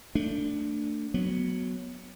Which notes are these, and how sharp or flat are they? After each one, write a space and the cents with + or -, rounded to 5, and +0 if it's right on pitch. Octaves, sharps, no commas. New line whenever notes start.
A3 +30 D4 +0
F#3 +0 B3 +0